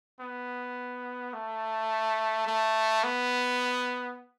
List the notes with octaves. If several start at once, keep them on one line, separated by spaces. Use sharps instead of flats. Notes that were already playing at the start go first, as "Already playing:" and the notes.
B3
A3
A3
B3